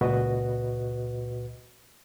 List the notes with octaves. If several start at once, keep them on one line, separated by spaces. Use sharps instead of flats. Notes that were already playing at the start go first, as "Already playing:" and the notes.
C#2 A#2 F#4 B4 D#5